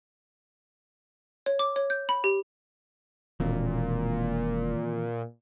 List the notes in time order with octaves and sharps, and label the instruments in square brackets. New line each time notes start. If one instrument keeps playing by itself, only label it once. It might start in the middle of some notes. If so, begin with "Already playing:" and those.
[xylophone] C#5
D6
C#5
G6
B5
G4
[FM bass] E1 [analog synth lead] A#2 [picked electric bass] D#3 E3 C4